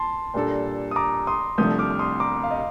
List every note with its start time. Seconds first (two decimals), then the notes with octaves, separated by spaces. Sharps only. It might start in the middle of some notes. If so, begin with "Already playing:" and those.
Already playing: A5 C6
0.34 A#2 G3 D4 A4
0.91 D#6
0.96 A#5 D6
1.27 C6 D#6
1.58 C2 C3 F3 A3 D4 D#6 G6
1.79 D6 F6
1.90 F6
1.99 C6 D#6
2.20 A#5 D6
2.44 F5
2.51 D#5